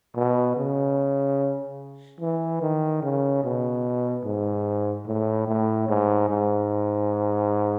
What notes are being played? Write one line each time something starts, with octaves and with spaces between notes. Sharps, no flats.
B2
C#3
E3
D#3
C#3
B2
G#2
A2
A2
G#2
G#2